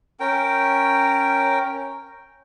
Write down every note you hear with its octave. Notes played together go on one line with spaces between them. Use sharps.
C#4 A#4 G5